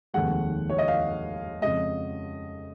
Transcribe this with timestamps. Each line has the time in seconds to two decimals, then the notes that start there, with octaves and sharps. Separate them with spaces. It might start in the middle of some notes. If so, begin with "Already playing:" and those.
0.14 F1 D#2 D#3 G#3 F#5
0.70 C#5
0.78 D#5
0.88 F5
1.61 F2 C#3 G#3 D#5